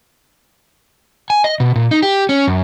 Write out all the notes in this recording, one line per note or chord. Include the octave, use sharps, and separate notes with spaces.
G#5
D#5
B2
A#2
D#4
G4
C#4
F#2